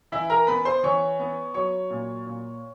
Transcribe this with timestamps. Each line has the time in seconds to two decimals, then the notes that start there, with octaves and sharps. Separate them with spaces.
0.12 E3 E4 E5
0.30 A#4 A#5
0.47 B3 B4 B5
0.65 C5 C6
0.83 E3 C#5 C#6
1.19 B3
1.54 F#3 C#5 C#6
1.90 A#2
2.26 A#2